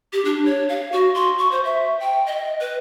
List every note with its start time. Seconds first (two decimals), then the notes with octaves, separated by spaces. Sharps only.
0.13 G4
0.25 D4
0.45 C#5
0.69 F5
0.92 F#4
1.15 C6
1.39 C#6
1.52 C5
1.65 E5
2.00 G5
2.26 D#5
2.61 B4